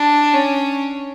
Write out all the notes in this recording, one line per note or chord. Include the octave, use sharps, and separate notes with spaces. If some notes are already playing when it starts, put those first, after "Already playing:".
Already playing: D4
C#4